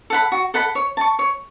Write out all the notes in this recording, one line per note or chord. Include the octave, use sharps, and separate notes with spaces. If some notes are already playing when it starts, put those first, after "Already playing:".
A4 F#5 B5
F#4
A4 F#5 B5
C#5
A5 C#6
C#5